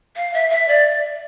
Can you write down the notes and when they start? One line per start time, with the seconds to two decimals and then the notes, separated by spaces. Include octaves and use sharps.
0.16 F5
0.34 E5
0.50 E5
0.68 D5